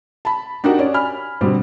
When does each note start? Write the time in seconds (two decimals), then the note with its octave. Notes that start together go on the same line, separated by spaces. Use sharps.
0.25 A5 B5
0.64 D4 D#4 F#4 G4 A#4 F#5
0.79 C#4 D5
0.94 G#5 B5 F6
1.41 B2 D3 G3 C4